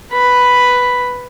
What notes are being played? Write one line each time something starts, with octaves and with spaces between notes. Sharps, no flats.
B4 B5